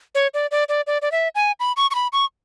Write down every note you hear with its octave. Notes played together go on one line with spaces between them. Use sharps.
C#5
D5
D5
D5
D5
D5
E5
G#5
B5
C#6
C#6
B5
C#6